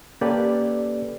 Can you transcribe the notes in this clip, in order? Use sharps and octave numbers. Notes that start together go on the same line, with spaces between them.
A#3 C#4 G4 A4 B4 D5